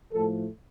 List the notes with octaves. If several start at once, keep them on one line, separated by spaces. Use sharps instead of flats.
A2 F3 A3 A4